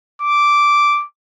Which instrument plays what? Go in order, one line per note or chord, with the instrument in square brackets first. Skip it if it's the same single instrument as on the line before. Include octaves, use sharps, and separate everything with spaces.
[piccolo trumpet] D6